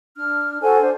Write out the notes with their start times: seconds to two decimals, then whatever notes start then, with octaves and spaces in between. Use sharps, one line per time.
0.16 D4 F6
0.62 F#4 A4 C5 G#5
0.82 D4 C5